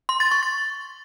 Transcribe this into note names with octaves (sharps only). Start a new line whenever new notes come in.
C6
A6
C#6
A6